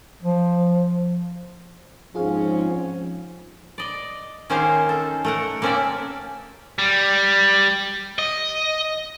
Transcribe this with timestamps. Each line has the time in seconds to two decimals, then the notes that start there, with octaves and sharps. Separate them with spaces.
0.23 F3
2.15 G#2 F3 C4 C#4 F4 G#4 F5
3.78 D5 D#5
4.50 D#3 A#3 C#4 D#4 G#4 C5
4.89 A4
5.25 A3 A#4 F#5
5.62 A#3 C4 C#4 A#4 D5 E5
6.79 G3
8.19 D#5